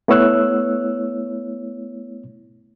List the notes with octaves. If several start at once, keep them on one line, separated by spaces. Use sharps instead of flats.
A3 B3 E4 C#5 E6 F#6